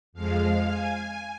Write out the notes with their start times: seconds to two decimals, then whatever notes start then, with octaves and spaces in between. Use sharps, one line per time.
0.13 F2 F3 G#3 F5
0.67 G#5